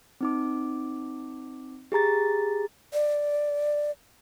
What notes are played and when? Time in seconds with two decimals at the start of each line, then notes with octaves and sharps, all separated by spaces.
0.21 C4 D#4 D6
1.92 G4 G#4 A#5 A6
2.93 D5